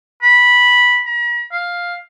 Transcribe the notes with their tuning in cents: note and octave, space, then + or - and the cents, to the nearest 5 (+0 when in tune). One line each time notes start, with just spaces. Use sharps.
B5 -10
A#5 +45
F5 +5